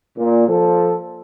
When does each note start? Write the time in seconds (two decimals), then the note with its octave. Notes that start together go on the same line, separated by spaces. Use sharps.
0.17 A#2
0.48 F3 A4